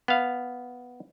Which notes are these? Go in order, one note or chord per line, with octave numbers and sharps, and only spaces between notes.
B3 F5